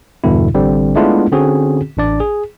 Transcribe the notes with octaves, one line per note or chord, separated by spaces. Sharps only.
E2 G2 B2 D3 E4
A1 D3 G3 C4
G#3 A3 B3 D4 E4 F4
D3 C4 C#4 F#4 G#4
A1 D4 D5
G#4